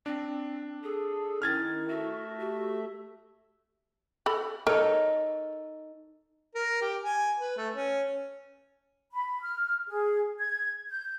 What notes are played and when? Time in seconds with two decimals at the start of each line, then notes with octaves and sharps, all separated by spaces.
0.06 C4 D4
0.83 G#4 A4
1.42 D#3 C#4 E4 F6 G#6 A6
1.89 A3 F#4 E5
2.40 F#4 G4
4.26 A4 B5
4.67 D#4 A4 A#4 C#5
6.55 A#4
6.81 G4
7.03 G#5
7.39 B4
7.57 A3
7.75 C#4
9.13 B5
9.43 F6
9.88 G#4
10.39 G#6
10.89 G6